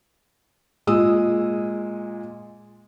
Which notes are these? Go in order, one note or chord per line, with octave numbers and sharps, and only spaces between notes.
A#2 G#3 D#6 E6